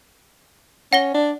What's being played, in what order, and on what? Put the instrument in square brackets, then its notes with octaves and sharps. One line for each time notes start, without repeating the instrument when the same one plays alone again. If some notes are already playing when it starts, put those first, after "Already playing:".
[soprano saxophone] C#4 [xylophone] F#5 A#6 G7
[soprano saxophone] D4